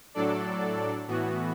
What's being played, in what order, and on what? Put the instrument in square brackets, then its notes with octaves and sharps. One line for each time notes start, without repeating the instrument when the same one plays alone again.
[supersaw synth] A2 F#3 D4 A4 D5
A2 E3 B3 F#4